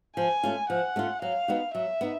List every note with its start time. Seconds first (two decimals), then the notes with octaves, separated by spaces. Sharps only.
0.17 F3 G#5
0.43 A3 C#4 F4
0.70 F3 F#5
0.96 A3 C#4 F4
1.22 F#3 F5
1.48 B3 D#4 F#4
1.75 F#3 E5
2.01 B3 D#4